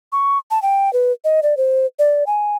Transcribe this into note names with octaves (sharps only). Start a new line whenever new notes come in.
C#6
A5
G5
B4
D#5
D5
C5
D5
G#5